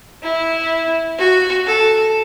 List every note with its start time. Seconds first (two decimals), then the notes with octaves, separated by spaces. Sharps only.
0.23 E4
1.19 F#4
1.66 A4